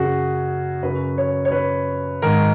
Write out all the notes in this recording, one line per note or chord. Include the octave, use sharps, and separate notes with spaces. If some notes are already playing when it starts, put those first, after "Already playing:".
Already playing: F#2 C#3 F#4 G#4
F#2 C#3 B4
C#5
C#5
B4
G#2 D#3 A#4